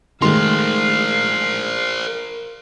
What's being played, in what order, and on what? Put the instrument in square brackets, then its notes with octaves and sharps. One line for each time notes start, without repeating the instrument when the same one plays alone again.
[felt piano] D#3 G#3 A3 [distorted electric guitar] A#4 C5 [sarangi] F5 [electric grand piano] C6